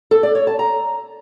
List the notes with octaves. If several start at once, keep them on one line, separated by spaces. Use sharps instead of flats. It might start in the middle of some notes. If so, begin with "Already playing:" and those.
A4
D5
C#5
A5
A#5